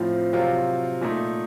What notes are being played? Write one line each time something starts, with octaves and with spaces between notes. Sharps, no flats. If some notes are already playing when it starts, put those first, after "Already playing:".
Already playing: A2 F3 C4
C3 F#3 C4 F4
A#2 A3 D#4